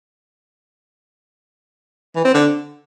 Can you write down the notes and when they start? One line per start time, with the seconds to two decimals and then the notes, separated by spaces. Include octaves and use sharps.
2.15 E3
2.25 C4
2.34 D3